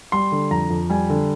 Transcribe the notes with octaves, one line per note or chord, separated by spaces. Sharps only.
G3 C6
D3
F2 A#5
F2
G3 G#5
D3